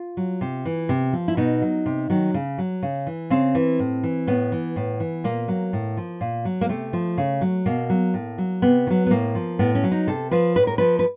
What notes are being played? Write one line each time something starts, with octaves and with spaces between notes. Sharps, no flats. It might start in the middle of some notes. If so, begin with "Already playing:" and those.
Already playing: F4
F#3
C3
E3
C3
F3
E4
B2 D#4
F#3
C3
D#3 F#3
C#3
F#3
C#3
E3
C#3 C4
E3
A2
E3
A2 B3
E3
A2
E3
A#2 A#3
F#3
A2
F3
A#2
F#3
A#3
C3 A3
F3
C#3
F#3
B2 A#3
F#3
A2
F#3
C3 B3
D#3
F#3
B3
A2 A#3
F3
A2 B3
C#4
F#3
D#4
C3 A4
F3 B4
A2 B4
A#4
F3 B4
B4